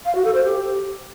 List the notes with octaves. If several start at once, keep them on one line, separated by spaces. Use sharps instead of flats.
F5
F#4
A4
C5
G4